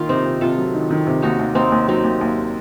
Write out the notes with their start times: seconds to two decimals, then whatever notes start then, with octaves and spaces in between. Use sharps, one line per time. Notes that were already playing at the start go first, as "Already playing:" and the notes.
Already playing: D#3 A#3 F4
0.09 C3 C4 D#4
0.25 C3
0.41 C3 F4 A4
0.58 F#3
0.74 D#3
0.90 D#3
1.07 C3
1.22 D#2 D#4 F#4
1.39 D#2
1.55 D#2 C4 D#4
1.72 D#2
1.88 F#3 C4 D#4
2.04 D#2
2.21 D#2